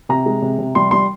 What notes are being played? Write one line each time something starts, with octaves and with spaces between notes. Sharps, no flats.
C3 A#5
G#3
C3
C3
G3 C6
G3 C6